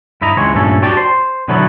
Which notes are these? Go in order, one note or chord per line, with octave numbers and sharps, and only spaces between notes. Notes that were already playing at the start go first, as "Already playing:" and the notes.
G2 E4 D#5 A#5
C#2 E3 G#3 C4 C#5
G2 A#2 A3 C#4 A4
F#4 G4 D5 G5 A5
C5
B1 D3 E3 F#3 A3 B3